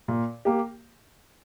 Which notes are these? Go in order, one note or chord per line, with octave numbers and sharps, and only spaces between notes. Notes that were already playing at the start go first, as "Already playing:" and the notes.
A#2
A#3 G4